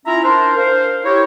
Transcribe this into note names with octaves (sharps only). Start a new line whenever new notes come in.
C#4 E4 F4 E5 A#5
D4 A#4 C5
A#4 C5 F5
E4 G4 A#4 C5 C#5